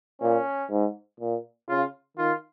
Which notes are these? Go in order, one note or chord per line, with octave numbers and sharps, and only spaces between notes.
A#2 C#4
G#2
A#2
C#3 F4
D#3 F4